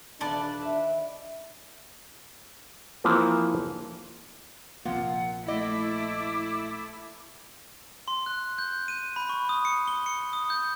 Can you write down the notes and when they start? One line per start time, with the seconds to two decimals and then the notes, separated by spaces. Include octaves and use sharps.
0.21 D#1 D4 B4 D5 A5
0.62 E5
3.04 E3 F3 A#3 C4
4.85 A#1 C3 F3 A#3 F4 F#5
5.48 A3 E4 D#5 D6
8.08 C6
8.26 F#6
8.58 G6
8.88 D#7
9.16 B5
9.29 C#6
9.49 D#6
9.65 C#7
9.88 G7
10.06 C#7
10.33 D#6
10.50 G6